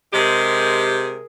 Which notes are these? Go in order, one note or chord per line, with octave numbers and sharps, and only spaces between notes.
C3 G#3 G4 G#4 A#4